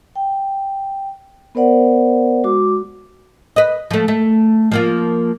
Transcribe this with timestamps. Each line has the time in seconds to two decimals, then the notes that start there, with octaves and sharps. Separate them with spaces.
0.16 G5
1.55 B3 A#4 C5 D5 F#5
2.44 G#3 F#4 D6
3.56 B4 D#5
3.91 F3 A3
4.08 A3
4.71 F3 A#3 F4